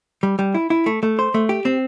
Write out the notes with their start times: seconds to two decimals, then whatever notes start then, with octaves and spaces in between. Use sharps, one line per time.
0.23 G3
0.39 G3
0.54 E4
0.70 E4
0.86 A3
1.03 A3
1.19 C5
1.34 A3
1.49 G4
1.65 C4